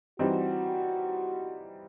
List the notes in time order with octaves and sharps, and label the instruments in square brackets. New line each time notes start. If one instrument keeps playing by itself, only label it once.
[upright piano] E3 G3 C4 D#4 [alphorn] F#4